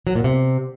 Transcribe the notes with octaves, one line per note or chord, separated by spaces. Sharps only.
F#3
A#2
C3